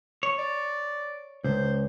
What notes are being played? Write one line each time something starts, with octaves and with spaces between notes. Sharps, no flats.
C#5
D5
C#2 C5